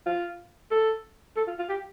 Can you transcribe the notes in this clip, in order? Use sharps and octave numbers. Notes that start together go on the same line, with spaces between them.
F4
A4
A4
F4
F4
G4